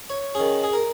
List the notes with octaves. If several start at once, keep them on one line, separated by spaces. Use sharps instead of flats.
C#5
D#3 C#4 G#4
G#4
A#4